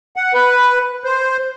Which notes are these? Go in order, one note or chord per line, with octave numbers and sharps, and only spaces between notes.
F#5
B4
C5